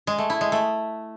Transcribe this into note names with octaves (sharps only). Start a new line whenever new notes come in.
G#3
A3
E4
G#3
A3